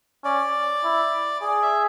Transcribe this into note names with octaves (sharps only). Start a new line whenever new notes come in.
C#4 D5
E4
G#4 D5
E5